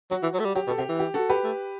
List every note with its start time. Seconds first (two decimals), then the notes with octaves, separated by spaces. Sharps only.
0.11 F#3 F#4
0.23 E3
0.34 F#3
0.39 A3
0.45 G3
0.55 F#3 G4
0.67 B2 A4
0.78 C3 G4
0.89 E3
0.99 G4
1.14 F#4 A4
1.29 G4 B4
1.44 A3